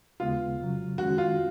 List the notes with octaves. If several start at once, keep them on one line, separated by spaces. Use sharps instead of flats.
D#2 C#3 G#3 B3 F4
F2 C#3 F#3
F2 D#3 G#3 C#4 F#4
F4